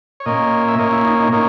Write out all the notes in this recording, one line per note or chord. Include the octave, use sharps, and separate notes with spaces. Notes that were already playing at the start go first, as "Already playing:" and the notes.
C#5
A#2 A#3 C#4 D#5
E5
A#2 A#3 C#4 D#5
E4
D#4
D#4
A#2 A#3 C#4 D#4